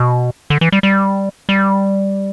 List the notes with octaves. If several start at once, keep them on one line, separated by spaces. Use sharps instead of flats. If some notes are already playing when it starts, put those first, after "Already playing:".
Already playing: B2
D3
E3
G3
G3
G3